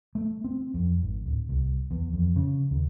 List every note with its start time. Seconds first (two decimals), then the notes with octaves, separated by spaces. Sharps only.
0.15 A3
0.44 C4
0.74 F2
1.03 G#1
1.26 D1
1.49 C2
1.91 E2
2.13 F2
2.36 C#3
2.71 D#2